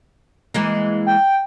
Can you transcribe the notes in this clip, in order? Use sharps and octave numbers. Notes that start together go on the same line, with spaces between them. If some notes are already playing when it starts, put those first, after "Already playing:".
E3 G#3 A#3
G5